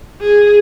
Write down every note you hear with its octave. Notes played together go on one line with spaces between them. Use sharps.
G#4